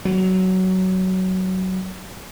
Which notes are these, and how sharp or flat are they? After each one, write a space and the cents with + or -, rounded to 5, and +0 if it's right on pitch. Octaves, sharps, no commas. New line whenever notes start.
F#3 +15